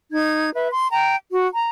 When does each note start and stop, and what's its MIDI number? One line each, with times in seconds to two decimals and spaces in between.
0.12 0.49 63
0.12 0.49 92
0.54 0.68 71
0.54 0.68 76
0.72 0.89 84
0.90 1.15 79
0.90 1.15 82
1.31 1.46 66
1.55 1.70 82